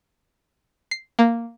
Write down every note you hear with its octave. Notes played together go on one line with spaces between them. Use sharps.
C7
A#3